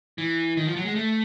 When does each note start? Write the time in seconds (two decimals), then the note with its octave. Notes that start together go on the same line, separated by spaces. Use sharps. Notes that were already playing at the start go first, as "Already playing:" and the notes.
0.18 E3
0.57 D#3
0.67 F3
0.76 F#3
0.85 G#3
0.95 A3